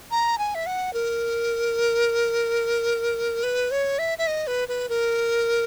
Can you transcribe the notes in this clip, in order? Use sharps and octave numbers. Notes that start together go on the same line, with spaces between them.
A#5
G#5
E5
F#5
A#4
B4
C#5
E5
E5
D#5
B4
B4
A#4